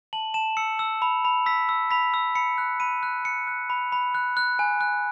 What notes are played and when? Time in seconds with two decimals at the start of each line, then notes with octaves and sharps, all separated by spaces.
0.13 A5 F#7
0.34 A5 E7
0.57 E6 C#7
0.79 E6
1.02 B5
1.25 B5
1.46 E6 B6
1.69 E6
1.91 B5 B6
2.14 E6
2.35 B5 C#7
2.58 F#6
2.80 B5 D#7
3.03 F#6
3.25 F#6 C#7
3.47 F#6
3.70 B5
3.92 B5
4.15 F#6
4.37 F#6
4.59 G#5
4.81 F#6